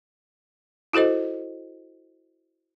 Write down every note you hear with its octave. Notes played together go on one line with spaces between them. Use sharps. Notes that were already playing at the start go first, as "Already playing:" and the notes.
E4 F#4 A4 C5 D#5